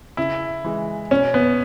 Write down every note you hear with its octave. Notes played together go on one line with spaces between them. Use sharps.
C#3 E4
E3 G#3
B2 C#4
B3